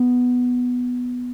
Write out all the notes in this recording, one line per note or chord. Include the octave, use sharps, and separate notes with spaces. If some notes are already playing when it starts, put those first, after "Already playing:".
Already playing: B3